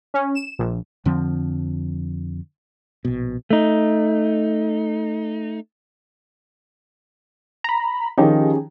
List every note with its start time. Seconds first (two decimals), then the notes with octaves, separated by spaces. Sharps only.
0.14 C#4
0.35 E7
0.59 A#1
1.05 F2 D3 F3 C4
3.05 A#1 B2
3.50 A3 D#4
7.64 A#5 B5
8.18 D#3 F3 C#4 D#4 G4 G#4